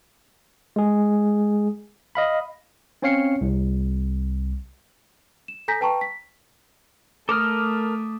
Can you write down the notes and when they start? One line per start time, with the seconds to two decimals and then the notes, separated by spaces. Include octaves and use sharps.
0.76 G#3 G#4
2.15 D#5 F5 B5
3.02 C4 C#4 C#5 F5 C7 C#7
3.41 C2
5.48 E7
5.68 A4 G#5 A#5 G6 A#6 B6
5.81 B4 G5 A5 A#5 C#6
6.01 B6
7.29 A3 A4 A#4 D6 D#6 F6